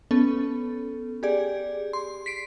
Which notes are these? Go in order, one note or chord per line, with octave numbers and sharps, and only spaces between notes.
B3 C#4 A4
G4 G#4 D5
C6
B6 C7 D7